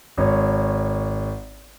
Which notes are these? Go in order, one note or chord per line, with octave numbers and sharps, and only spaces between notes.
G#1 C#5